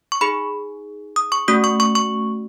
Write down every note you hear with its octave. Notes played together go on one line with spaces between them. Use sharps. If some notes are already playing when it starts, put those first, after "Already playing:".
C#6
D#4 G#4 B5
D#6
C#6
A3 C#4 F#4 D#6
C#6
C#6
C#6